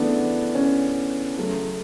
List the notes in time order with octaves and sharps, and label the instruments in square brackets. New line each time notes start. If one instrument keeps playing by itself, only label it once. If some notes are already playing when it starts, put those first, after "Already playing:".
Already playing: [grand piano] C#3 E3 A3 B3 D4
C#4
C#3 F#3 A3